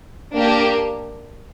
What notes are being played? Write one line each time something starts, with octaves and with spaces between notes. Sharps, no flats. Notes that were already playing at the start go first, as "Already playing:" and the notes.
A#3 D4 G4